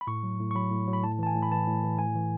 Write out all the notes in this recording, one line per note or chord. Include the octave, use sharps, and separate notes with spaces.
B5
A2 C#6
F#3
A2
C#6
F#3 B5
A2
F#3
B5
A2 A5
E3 A5
G#5
A2
B5
E3 A5
A2
E3
A2 G#5
E3